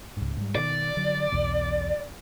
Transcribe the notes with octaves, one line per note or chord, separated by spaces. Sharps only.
C#2 G#2
G#2 G3
B2 D#3 D5
D3 F#3
B1 E2 B2